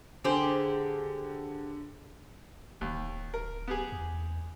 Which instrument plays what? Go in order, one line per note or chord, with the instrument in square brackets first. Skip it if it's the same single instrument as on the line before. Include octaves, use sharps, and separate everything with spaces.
[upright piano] D3 [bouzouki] G4 G#4 C5
[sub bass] D1 [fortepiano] D#2
[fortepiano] A#4
B3 G4 G#4
[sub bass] E2